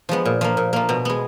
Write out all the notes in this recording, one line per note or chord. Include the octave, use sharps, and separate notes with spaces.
F3 G#3 B3
A#2
F3 A#3
A#2
F3 A#3
B2
G#3 B3